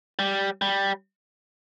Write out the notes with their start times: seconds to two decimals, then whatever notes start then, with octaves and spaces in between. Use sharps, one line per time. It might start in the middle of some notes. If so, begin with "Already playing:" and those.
0.19 G3
0.62 G3